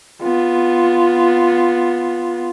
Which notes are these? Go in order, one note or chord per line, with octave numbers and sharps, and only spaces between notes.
B3 F4